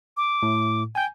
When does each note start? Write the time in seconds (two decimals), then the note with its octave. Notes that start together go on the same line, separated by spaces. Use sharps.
0.17 D6
0.43 A2
0.95 G5 G#5 G6